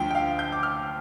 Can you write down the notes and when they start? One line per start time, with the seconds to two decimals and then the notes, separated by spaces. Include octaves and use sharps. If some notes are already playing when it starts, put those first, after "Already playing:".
Already playing: D2 D3 F3 G5
0.11 G5
0.15 F5
0.39 G6
0.52 D6
0.63 F6